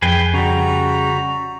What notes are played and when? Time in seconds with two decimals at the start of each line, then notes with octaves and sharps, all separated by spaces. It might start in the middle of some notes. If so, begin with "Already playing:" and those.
0.02 F2 G#4 B4 G5
0.34 C#3 G3 F#4 A#5